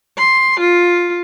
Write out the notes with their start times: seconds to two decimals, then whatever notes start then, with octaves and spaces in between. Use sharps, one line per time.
0.17 C6
0.60 F4